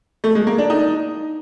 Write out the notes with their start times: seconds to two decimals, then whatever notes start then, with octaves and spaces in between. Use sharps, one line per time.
0.24 A3
0.35 G#3
0.47 A#3
0.58 D4
0.70 D#4